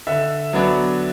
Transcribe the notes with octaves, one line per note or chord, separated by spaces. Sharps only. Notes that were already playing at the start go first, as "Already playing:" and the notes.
D3 E5
F#3 B3 D4